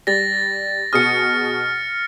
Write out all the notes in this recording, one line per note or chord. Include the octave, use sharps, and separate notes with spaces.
G3 A6 A#6
B2 G#4 D#6 F6 C#7